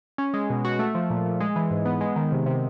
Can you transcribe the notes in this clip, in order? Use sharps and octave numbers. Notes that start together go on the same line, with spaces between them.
C#4
G#3
B2
F#4
A3
F3
A#2
A#2
G#3
E3
G#2
B3
G#3
D#3
C3
C3